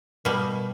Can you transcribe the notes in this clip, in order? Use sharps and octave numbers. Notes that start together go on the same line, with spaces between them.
B2 G3 A#3